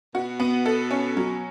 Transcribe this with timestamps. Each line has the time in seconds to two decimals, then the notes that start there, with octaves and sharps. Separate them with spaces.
0.14 B2 F#4
0.40 B3
0.66 A4
0.91 C#4
1.17 F#3